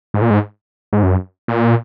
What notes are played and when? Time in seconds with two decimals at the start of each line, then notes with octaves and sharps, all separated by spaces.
0.14 G#2
0.22 A#2
0.30 G#2
0.93 G#2
1.03 F#2
1.48 A#2